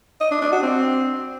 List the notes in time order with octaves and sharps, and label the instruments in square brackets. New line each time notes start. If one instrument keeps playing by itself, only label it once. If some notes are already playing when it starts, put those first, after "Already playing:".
[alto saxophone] D#5
D4
D4
F#4
C4